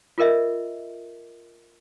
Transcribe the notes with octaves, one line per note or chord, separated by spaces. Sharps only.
F4 A4 A#4 D#5 E5